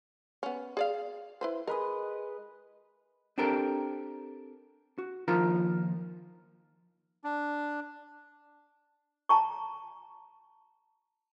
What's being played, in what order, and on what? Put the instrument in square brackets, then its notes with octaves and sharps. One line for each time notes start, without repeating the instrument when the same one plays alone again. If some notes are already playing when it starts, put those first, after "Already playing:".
[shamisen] B3 C#4
G#4 D5 F5
E4 B4 C5
[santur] G#3 B4 D#5 [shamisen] A#4
[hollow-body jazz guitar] C4 D4 G4 A4 A#4
F#4
D#2 F3 D#4 F4 A#4 A#5
[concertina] D4
[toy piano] A5 A#5 C#6